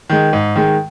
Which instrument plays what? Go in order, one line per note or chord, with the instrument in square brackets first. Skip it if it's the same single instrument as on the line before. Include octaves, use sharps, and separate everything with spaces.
[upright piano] D#3 G#3
G#2
D#3 G#3